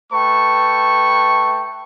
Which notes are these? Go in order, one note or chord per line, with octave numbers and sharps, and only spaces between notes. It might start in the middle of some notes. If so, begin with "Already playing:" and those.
A3 B4 G5 A5 C#6